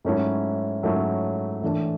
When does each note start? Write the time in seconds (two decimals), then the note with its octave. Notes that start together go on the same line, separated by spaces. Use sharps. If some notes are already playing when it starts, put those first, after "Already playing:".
0.05 G#2 F#3 A3 C#4 E4
0.83 G#2 F#3 A3 C#4 E4
1.62 A2 E3 A3 D4